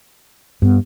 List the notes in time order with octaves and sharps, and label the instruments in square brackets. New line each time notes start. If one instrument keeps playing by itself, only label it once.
[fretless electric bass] G2 [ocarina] B3